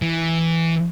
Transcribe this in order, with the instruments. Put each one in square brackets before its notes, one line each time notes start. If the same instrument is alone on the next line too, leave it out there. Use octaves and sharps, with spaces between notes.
[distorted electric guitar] E3